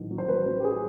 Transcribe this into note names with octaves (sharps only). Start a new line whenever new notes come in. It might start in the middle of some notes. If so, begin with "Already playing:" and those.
Already playing: A1 D#3 F#3
F#3
C5
F#3 B4
F#3
G4
G#4